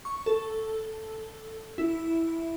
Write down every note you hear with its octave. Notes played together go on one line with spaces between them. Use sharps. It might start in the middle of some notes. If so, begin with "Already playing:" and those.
C#6
A4
E4